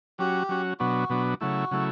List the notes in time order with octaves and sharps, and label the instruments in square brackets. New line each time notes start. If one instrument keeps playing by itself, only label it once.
[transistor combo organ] F#3 C#4 F#4 [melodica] G4
[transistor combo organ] F#3 C#4 F#4
[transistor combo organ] B2 F#3 B3 D4 [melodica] F#4
[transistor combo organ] B2 F#3 B3 D4
[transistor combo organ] C#3 F#3 A3 E4 [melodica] F#4
[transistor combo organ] C#3 F#3 A3 E4